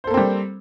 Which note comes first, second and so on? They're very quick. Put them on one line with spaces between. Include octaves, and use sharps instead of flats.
C5 A4 A#3 C4 G3